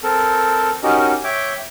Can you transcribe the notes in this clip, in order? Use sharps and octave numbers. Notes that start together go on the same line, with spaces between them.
C4 A4 A#4
C#4 D#4 F#4 G4 A#4 D#5
C#5 E5 G5 D6